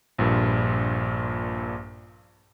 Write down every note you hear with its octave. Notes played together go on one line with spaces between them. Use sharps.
A#1 G2 A#2